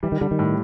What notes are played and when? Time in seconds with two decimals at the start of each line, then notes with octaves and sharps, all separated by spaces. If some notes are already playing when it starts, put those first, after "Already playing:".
0.03 E3 G3
0.12 D#3
0.21 D3 G3
0.31 D#3
0.39 A2